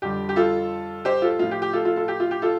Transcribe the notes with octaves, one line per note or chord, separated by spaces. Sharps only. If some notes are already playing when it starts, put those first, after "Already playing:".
F2 D3 G3 G4
G4
F4 A4
G4 C5
F4 A4
A2 F3 F4
G4
G4
F4 A4
F4 A4
F4 A4
G4
F4
G4
F4 A4